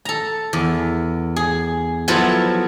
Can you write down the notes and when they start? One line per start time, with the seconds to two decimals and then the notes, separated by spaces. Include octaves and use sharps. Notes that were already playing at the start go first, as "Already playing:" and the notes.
0.05 A4 A#5
0.53 E2
1.36 G#4
2.08 F3 F#3 B3 E4 F4 A4